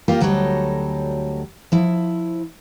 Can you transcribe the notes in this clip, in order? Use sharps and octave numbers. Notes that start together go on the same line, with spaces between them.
A#3 F4 G4 A#4
D2 F#3 G3 A4 C#5 D#5
F3 E4